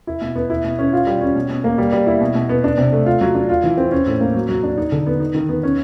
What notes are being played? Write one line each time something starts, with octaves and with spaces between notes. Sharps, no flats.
E4
B2
B3
E4
B2
C#4
F4
G3
C#4
B2
B2
A#3
G3
G3
E4
B2
B2
B3
D4
C3
A3
F4
F#3
D4
F4
E3
C4
C#4
A2
A#3
F#3
F#3
D4
D#4
D3
B3
D#4
D#3
B3
C#4